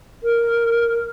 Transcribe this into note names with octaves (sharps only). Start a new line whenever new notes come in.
A#4